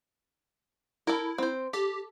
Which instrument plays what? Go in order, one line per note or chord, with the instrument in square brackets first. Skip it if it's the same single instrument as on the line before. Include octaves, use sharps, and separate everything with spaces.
[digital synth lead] E4 [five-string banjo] A4 A#4
[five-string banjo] C4 C5
[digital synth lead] G4 [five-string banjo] A4